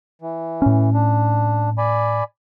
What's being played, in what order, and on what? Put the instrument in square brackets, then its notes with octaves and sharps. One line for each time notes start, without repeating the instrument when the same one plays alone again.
[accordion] E3
[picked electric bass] A2 C#4
[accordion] D4
D5 G#5 B5